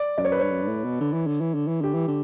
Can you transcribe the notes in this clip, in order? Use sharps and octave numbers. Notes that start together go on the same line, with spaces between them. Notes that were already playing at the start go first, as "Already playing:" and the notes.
Already playing: D5
F#2 D5
C#5
B4
G2 C#5
F#2
G2
A2
B2
D3
E3
D3
E3
D3
E3
D3 G4
E3
D3